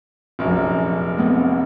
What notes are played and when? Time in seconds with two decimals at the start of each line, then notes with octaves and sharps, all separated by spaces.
0.39 F1 A#1 F#2
1.18 A3 B3 C4